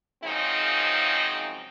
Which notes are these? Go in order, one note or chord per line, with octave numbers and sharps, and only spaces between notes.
F#2 C#3 F3 G#3 C4 D#4